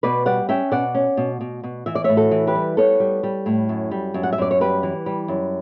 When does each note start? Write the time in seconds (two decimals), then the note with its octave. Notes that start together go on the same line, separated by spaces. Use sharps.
0.03 B2 B4 D5
0.26 G3 D5 F#5
0.49 C#4 E5 G5
0.71 B2 D5 F#5
0.95 C#4
1.17 B2
1.41 B2
1.63 B2
1.86 E3 E5
1.95 D5
2.04 A2 C#5 E5
2.17 F#4 A4
2.31 E3
2.47 G4 B4
2.55 G3
2.77 B3 A4 C#5
3.00 G3
3.23 G3
3.46 A2
3.69 F#2
3.91 G3
4.14 F#2
4.23 F#5
4.33 E5
4.38 F#2 D5
4.51 C#5
4.60 G3 G4 B4
4.83 E3
5.06 G3
5.28 F#2